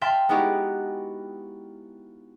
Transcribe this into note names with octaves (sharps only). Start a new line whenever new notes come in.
E5 F5 G5 A5 C6 B6
G#3 B3 D#4 E4 F#4 G4